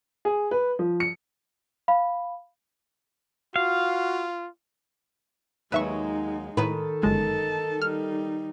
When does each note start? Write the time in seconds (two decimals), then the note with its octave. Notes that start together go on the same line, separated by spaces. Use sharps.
0.25 G#4
0.51 B4
0.79 F3
1.00 C#7
1.88 F5 B5
3.56 F4 F#4 F5
5.72 D#2 F#3 G#3 D#4 B4 E5 C#6
6.57 A2 D#3 A4 B4
7.03 G1 F#2 G#3 D#4 A5
7.82 G3 D#4 F6